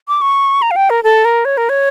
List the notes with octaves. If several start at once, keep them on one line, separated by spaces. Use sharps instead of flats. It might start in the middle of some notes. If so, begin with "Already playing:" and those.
D6
C#6
A#5
F5
G5
A#4
A4
A#4
C#5
A#4
C#5